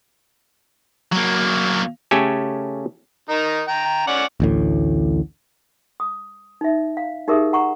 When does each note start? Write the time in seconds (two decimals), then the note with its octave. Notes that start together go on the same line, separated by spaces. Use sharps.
1.12 F#3 A#3
2.11 C#3 A3 C#4 G4 A4 G#5
3.29 D#3 D#4 A#4
3.68 G5 A#5
4.07 C#4 D5 F#5
4.40 A1 D2 A2
6.00 D#6
6.61 D#4 E5
6.97 F5
7.28 D#4 G4 G#4 A#4 E5 D#6
7.53 F#5 A#5 C#6